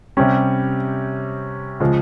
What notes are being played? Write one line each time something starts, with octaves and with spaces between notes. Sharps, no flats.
C3 G3 C#4
C#3 F3 G#3